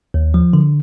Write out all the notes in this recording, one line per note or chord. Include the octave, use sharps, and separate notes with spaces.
D#2
F3
D3